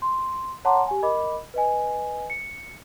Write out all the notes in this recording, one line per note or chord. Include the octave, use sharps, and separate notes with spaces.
C6
C#5 F#5 A5 A#5 C6 D6
G4 G#5
A#4 D#5 B5 D6
B4 D#5 G#5
C#7